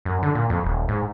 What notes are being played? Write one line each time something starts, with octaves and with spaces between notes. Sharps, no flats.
F#2
D3
A#2
F2
D#1
G#2